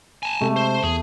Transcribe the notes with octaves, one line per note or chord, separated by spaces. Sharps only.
G#5 A5
C3 G#3 A3
C5
E2 G#4